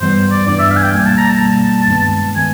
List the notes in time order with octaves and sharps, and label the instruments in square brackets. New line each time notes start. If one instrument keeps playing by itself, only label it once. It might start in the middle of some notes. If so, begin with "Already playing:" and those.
[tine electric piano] G2 E3 G3 B3 [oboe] C5
[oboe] D5
[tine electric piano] G2 E3 G3 B3 [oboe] D5
[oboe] E5
F5
G#5
G5
[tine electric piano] B2 G3 A#3 [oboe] G#5
[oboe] A5
A#5
A5
[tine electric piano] B2 G3 A#3
G2 D#3 G#3 B3
[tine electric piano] D#3 G#3 B3 [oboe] G#5